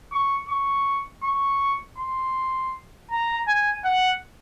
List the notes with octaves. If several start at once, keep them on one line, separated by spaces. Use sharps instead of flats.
C#6
C#6
C#6
C6
A#5
G#5
F#5